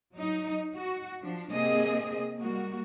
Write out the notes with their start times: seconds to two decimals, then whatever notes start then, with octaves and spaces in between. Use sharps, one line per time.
0.14 F#3 D#4
0.76 F#4
1.22 F3 D4
1.51 C3 A#3 C4 D4 G#4 D#5
2.41 G3 A#3 F#4